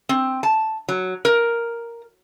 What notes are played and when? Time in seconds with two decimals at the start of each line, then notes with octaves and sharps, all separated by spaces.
0.09 C4
0.43 A5
0.89 F#3
1.25 A#4